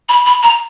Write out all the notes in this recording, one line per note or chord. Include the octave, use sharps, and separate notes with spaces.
B5
B5
A#5